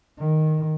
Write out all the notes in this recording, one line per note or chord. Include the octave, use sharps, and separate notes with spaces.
D#3